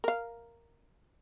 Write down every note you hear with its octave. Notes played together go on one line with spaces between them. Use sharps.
A#4 F5